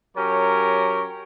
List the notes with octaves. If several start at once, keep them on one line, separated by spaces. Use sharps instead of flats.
F#3 C#4 G4 A#4 C#5